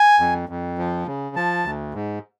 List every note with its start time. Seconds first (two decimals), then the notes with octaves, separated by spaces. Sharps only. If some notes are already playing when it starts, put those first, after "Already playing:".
Already playing: G#5
0.20 F2
0.49 F2
0.78 F3
1.06 C#3
1.36 F3 A5
1.64 D2
1.94 G#2